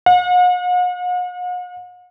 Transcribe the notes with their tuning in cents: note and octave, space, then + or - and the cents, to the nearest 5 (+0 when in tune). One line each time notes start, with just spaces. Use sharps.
F#5 -45